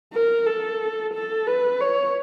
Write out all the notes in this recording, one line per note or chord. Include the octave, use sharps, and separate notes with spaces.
A#4
A4
A4
B4
C#5